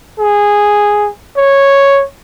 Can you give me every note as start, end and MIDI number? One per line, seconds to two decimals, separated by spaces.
0.19 1.08 68
1.36 2.03 73